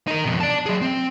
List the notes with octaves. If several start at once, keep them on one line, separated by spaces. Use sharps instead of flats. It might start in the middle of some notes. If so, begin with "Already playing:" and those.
D#4 A#4
F2 B2
D5 A5
F#3 G#4
C4